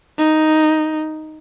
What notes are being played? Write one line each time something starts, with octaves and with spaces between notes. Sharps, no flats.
D#4